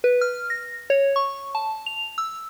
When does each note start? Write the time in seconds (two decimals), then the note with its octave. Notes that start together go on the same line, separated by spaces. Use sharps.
0.04 B4
0.21 F6
0.50 A#6
0.90 C#5
1.16 C#6
1.55 A5
1.86 F7
2.18 E6